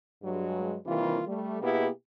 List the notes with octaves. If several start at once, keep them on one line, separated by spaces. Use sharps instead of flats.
G2 F#3 G#3
C3 D#3 E3 G3 A#3 F4
G3 A3
B2 A#3 B3 E4 G4 G#4